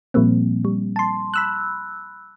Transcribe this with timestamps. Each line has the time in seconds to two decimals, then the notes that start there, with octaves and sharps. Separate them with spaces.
0.14 A#2 F3 G3 A#3 C4
0.65 G3
0.96 A5 C6
1.34 B5 E6 F#6